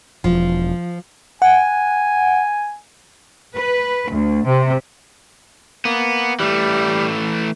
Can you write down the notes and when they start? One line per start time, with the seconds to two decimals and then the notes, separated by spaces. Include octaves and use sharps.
0.24 E1 F3
1.42 F#5 G#5
3.55 B4
4.09 D2
4.46 C3
5.85 A#3 B3
6.40 E3 G3 A3